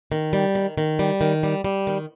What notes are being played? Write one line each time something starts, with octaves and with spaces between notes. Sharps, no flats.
D#3
G3
D#3
D#3
G3
D#3
G3
G3
D#3